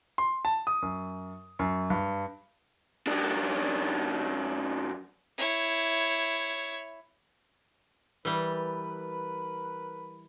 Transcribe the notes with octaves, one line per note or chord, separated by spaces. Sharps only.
C6
A5
D#6
F#2
F#2
G2
F#2 D4
E4 C#5
E3 G3 A#4 B4